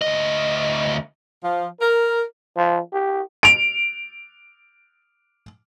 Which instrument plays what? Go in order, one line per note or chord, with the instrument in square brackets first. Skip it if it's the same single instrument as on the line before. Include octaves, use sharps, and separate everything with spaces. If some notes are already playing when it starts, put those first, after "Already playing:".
[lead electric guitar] D2 D#5
[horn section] F3
A#4
[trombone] F3
G4
[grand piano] D7 F7